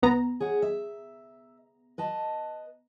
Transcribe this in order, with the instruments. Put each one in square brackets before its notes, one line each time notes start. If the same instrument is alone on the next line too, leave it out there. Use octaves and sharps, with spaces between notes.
[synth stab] C2 B3 A#5
[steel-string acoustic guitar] G#4 C#5 F#5
E5
B4 D#5 A5